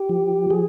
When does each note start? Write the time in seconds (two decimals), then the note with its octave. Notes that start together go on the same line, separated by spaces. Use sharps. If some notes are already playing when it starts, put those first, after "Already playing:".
Already playing: G4
0.09 F3
0.50 F3 G#4